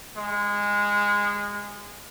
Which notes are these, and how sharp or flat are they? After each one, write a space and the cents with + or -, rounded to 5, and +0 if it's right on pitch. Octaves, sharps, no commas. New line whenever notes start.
G#3 -20